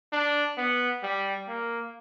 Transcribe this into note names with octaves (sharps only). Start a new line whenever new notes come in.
D4
B3
G3
A#3